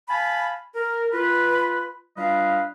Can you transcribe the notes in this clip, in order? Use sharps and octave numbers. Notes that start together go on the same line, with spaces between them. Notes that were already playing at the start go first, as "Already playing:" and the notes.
F5 G#5 A5 B5
A#4
F4 B4
G3 D4 F4 B4 D#5 F5